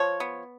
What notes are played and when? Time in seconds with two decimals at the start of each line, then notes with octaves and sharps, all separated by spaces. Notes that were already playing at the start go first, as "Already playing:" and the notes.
Already playing: F3 C#5
0.20 B3